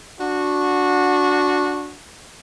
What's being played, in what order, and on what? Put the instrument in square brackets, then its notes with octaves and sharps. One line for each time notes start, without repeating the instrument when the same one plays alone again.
[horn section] D4 F#4